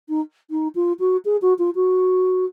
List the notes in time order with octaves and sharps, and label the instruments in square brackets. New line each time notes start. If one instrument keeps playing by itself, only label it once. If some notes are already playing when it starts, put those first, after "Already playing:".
[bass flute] D#4
D#4
F4
F#4
G#4
F#4
F4
F#4